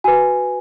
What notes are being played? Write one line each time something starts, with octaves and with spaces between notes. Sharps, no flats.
F#4 B4 G#5